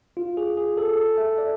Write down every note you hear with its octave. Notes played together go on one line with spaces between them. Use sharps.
F4
G#4
G#4
A4
A4
E5
D5